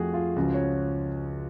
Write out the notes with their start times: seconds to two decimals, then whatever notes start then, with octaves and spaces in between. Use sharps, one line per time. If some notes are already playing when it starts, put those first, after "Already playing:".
Already playing: F2 F3 A3 F#4 G#4
0.14 F4
0.36 C#2 C#3 F3 F#4
0.54 C#5